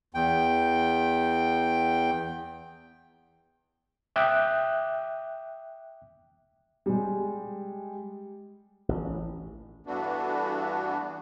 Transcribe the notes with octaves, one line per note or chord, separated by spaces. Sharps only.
E2 G5
E5 G5 D6 D#6 F#6
G3 G#3
A1
G2 E3 A3 B3 D4 F#4